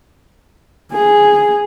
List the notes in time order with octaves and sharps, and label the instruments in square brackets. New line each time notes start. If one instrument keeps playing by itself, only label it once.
[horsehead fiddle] G#4